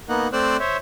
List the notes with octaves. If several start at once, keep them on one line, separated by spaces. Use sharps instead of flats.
A#3 B3 D#4 F#5
A3 C4 C5 D5 E6 F#6
C5 C#5 E5